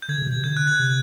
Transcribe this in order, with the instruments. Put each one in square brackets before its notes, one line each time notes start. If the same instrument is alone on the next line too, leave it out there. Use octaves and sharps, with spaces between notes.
[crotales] G6
[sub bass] D3 [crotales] G#6
[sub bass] C#3
C3
B2
C3
[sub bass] D3 [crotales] G6
[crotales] F#6
G#6
[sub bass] C3